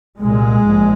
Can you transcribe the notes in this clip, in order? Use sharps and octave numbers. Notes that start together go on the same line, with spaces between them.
C2 A#2 G#3
A#1 G#2